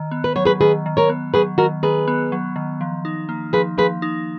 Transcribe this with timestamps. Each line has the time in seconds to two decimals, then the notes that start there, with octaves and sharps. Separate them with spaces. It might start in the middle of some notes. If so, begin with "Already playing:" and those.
Already playing: D#3
0.11 B3
0.24 B4
0.36 F#3 C#5
0.45 G#4 B4
0.61 D#3 G#4 B4
0.86 D#3
0.97 A#4 C#5
1.09 B3
1.34 F#3 G#4 B4
1.58 D#3 F#4 A#4
1.83 D#3 G#4 B4
2.08 B3
2.32 F#3
2.56 D#3
2.81 F3
3.05 D#4
3.29 A#3
3.53 F3 G#4 B4
3.78 F3 G#4 B4
4.02 D#4